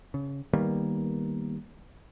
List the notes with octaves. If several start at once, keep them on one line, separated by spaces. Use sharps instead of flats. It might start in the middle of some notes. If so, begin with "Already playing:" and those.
C#3
D#3 G3 A#3 B3